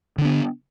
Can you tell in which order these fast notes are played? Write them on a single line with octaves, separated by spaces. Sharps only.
D3 D4 B3